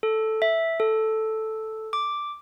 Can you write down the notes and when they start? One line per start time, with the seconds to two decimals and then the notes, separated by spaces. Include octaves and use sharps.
0.03 A4
0.42 E5
0.80 A4
1.93 D6